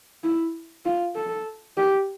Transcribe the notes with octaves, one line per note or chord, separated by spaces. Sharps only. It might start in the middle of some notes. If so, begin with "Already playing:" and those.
E4
F4
A4
G4